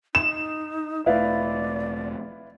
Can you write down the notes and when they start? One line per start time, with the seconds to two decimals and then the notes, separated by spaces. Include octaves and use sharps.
0.15 D#4 E7
1.06 E1 A3 E4 B4 D5 F5